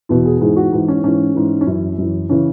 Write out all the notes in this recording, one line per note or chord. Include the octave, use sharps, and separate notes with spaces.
E2 B2 E4
G#4
G#2 E3 G#4
F#4
G#2 E3
C#4
G#2 E3 C#4
G#2 E3
C#4
F#2 E3 E4
F#2 E3
C#3 E3 C#4